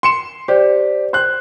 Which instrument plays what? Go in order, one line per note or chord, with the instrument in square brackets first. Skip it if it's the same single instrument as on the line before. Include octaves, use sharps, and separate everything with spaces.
[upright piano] C6 C#7 E7
[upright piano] G4 [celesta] C5 D5
[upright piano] C5 F#6